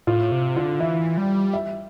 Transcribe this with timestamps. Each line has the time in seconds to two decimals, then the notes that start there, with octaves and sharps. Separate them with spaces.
0.07 A2 F4
0.32 C3
0.56 D3 F4
0.80 E3 E5
1.18 G3
1.54 E5